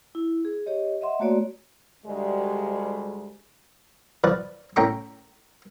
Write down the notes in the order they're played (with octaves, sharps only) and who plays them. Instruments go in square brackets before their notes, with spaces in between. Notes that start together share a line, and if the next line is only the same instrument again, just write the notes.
[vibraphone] E4
G#4
G4 C#5 D#5
D#5 E5 F#5 C6
A3 A#3 F#4 C#5 D5
[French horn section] D2 G3 G#3
[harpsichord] F3 B4 D5
A2 C#4 G5 A#5 C#6 D6